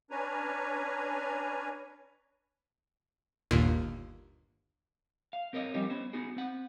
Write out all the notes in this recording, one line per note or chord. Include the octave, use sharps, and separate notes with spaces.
C#4 D4 B4 C#5 G#5 A#5
G1 D#2 A#2
F5
C4 A#4 C#5 D#5
F3 G3 C4 C#4 D#4 G4
B3 C#4 C5
B3 D#4 F#4 G#4
C4 F#5